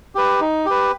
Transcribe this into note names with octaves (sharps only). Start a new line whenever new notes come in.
G4 B4
D#4
G4 B4